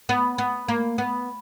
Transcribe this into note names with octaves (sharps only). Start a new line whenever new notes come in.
B3
B3
A#3
B3